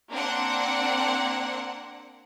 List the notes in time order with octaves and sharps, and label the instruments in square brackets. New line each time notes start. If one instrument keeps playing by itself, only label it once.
[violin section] A#3 C4 D4 F#5